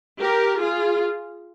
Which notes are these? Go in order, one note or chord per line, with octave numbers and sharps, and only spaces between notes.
G4 A#4
F4 G#4